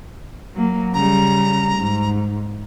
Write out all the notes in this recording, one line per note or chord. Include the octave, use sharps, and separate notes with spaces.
F#3 A#3
C#3 G3 A#5
G#2